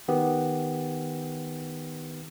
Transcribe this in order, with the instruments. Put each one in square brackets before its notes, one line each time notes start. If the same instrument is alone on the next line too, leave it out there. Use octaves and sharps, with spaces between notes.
[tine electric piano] D#3 B3 G4